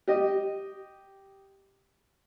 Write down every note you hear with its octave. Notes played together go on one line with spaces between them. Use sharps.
G4 D#5